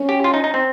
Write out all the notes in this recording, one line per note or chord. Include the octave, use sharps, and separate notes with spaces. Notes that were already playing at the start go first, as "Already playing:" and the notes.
Already playing: C#4
G4
F4
D#4
D#4
C4